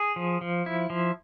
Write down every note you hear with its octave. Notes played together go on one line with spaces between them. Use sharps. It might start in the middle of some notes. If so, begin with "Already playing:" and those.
Already playing: G#4
F3
F3
E4
F3